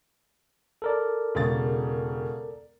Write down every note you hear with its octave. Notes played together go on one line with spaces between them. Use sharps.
A4 A#4 D5
E1 C#3 A6